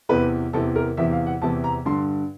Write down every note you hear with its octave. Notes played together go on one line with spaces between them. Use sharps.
E2 C3 E3 B4
E2 C3 E3 A4
A#4
E2 C3 E3 E5
F5
F#5
E2 C3 E3 A5
A#5
G2 D3 C6